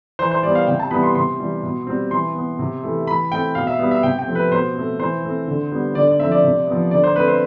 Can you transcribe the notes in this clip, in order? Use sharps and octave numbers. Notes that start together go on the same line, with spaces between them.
E3 C5
C5
G3 B3 D5
F5
C3 G5
A5
E3 G3 B3 B5
C6
C3 C6
E3 G3
B2
G3 C4
E3 C6
B3
C3
E3 A3
E3 B5
A3 C4 G5
B2 F5
E5
G3 B3
E5
C3 G5
G5
F3 A3 C4
B4
B2 C5
A3 C4
E3 C5
A3 C4
D3
G3 B3
D3 D5
D5
F3 A3 C4 E5
D5
C3
F3 B3
D3 D5
C5
A3 C4 B4
C5